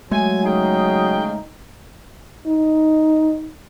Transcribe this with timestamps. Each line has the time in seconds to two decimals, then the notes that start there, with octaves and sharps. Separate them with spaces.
0.11 F#3 G#3 A3 G#5
0.44 C#3 D#4 G#4 G5
2.47 D#4